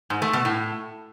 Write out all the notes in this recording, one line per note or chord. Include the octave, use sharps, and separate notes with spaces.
G#2
A3
B2
A2